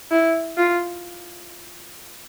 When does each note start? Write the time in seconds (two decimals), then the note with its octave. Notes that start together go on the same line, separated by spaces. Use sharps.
0.11 E4
0.57 F4